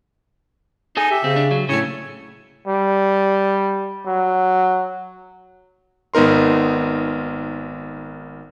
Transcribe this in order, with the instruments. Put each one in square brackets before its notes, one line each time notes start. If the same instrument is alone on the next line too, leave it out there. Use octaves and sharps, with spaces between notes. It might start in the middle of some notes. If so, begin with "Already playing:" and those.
[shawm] D#4 [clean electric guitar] G#4 A4 G#5
[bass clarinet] G4 [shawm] E5
[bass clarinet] C#3 [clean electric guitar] C4
[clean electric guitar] D4
F#3
[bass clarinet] A2 [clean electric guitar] C#3 A3 [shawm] C#5
[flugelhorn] G3
F#3
[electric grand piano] G#1 B3 D#4 A#4 C6